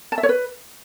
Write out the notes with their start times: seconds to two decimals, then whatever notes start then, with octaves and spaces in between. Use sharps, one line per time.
0.12 A5
0.18 E5
0.23 C#5
0.29 B4